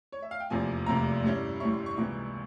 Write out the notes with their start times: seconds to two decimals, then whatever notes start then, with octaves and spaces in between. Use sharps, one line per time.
0.12 C#5
0.22 E5
0.31 F5
0.40 G5
0.50 F1 E2 C3 F3 A#3 G#5
0.86 F1 E2 C3 F3 A#3 A#5
1.24 G2 G3 C#4 E4
1.60 G2 G3 C#4 E4 C#6
1.73 C6
1.86 C#6
1.97 C#2 C3 E3 A#3 E4